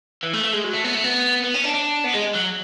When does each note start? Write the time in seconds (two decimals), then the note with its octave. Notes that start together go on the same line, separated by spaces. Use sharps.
0.23 E3
0.33 A3
0.44 A3
0.53 G#3
0.64 F#3
0.73 A3
0.84 B3
0.94 A3
1.04 B3
1.44 B3
1.54 C#4
1.64 D4
1.74 D4
2.04 B3
2.14 G#3
2.35 F#3